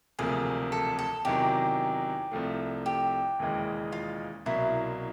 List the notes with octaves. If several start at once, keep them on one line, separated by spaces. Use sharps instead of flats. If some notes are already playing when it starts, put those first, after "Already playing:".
E1 D2 C3 F3 A#3 G#4
A4
A4
E2 C3 D#3 F#3 G4
C2 C3 F3 A3
G4
E1 D#2 C#3 E3 G#3
F4
C2 B2 F#3 A#3 E4